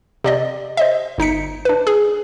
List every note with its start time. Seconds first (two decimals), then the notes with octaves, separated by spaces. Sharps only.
0.24 C3 D5 D#5
0.77 C5 D#5 E5
1.18 G1 D#4 B6 C#7
1.65 D4 B4
1.87 G#4